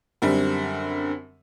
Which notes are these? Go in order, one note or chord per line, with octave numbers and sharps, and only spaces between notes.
F#2 D3 G3 C4